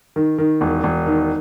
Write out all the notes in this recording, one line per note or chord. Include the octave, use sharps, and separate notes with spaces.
D#3
D#3
E1
E1
D#3